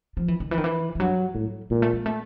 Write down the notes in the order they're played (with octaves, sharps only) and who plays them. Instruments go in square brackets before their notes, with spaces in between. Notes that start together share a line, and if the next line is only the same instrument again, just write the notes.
[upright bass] F3
E3
D#3
E3
D#3
E3
F3
[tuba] G2 [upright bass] F#3
[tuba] A2 [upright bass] G3
[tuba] A#2 [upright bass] G#3
[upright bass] A3
G#3
A3